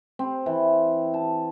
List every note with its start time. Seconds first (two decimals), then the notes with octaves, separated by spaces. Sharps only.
0.19 C4
0.46 E3
1.14 A5